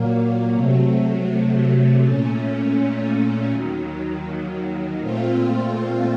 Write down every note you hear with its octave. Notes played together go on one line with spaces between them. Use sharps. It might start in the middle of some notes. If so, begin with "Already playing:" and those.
Already playing: A#2 F#3 A#3
C3 F#3 A3
A#2 A3 C#4
D#2 D#3 F#3
A#2 A3 C4 F4